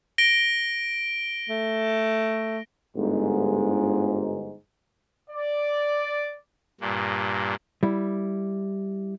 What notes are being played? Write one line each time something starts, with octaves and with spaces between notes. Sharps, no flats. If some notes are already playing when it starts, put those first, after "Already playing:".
A#6 D7 G7
A3
G1 G#2
D5
G2 A#2
G3 E4